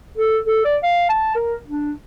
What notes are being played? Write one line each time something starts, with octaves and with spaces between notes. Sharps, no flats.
A4
A4
D5
F5
A5
A#4
D4